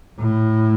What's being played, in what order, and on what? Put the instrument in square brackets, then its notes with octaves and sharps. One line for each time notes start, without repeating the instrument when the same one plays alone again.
[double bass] A2